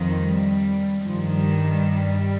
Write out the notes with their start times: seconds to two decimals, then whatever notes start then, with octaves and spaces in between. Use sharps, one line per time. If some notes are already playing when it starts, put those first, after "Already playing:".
Already playing: F2 D#3
0.17 G3
1.06 G2 D#3 F3
1.35 G3
1.65 G3
1.94 G3